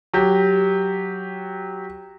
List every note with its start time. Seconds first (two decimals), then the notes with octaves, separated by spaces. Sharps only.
0.14 F#3 G4